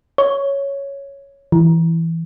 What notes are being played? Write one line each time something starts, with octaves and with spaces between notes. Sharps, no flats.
C#5
E3